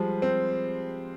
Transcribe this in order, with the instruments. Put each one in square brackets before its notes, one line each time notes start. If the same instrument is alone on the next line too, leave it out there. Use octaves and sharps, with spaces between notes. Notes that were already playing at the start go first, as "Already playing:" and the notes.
Already playing: [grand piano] F3 G#3 [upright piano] G3
[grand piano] C4